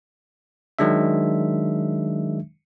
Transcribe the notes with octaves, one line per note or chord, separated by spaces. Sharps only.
D#3 F#3 G#3 D4 E5